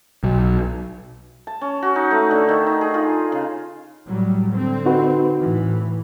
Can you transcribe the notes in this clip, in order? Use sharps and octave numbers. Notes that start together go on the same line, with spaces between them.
B1
A5
C#4
F#4
D#4
A3
D3
D#3
D#4
G#4
F4
C#3
A2 F#3 G3
D3 C4
D#4 F#4 B4
A2 E3